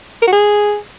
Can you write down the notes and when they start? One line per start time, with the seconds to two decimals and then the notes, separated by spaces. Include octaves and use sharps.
0.22 A#4
0.27 F#4
0.33 G#4